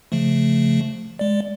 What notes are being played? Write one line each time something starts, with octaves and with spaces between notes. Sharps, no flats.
C#3 F3 A3
G#3 D5